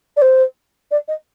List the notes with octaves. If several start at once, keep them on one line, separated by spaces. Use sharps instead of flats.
D5
C5
D5
D#5